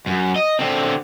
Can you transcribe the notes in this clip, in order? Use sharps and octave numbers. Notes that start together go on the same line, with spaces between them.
F#2
D#5
D3 C4